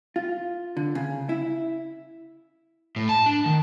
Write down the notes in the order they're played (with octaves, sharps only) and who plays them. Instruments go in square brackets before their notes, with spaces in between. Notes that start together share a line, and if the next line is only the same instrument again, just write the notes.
[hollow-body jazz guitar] F4
D3
C#3
E4
[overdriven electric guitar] A2
A5
D4
D#3